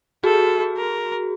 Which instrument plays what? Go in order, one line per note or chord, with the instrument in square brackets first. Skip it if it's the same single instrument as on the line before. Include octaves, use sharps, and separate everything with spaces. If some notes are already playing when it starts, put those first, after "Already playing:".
[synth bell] F#4 G#4 [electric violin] A4
[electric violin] A#4